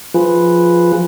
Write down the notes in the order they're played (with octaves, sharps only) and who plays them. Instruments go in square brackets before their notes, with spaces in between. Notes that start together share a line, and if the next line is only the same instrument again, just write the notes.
[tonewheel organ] F3 F4 G#4 B4